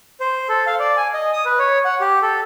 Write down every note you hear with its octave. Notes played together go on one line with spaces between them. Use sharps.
C5
A4
F5
D5
G#5
D#5
D#6
B4
C#5
F#5
G4
A4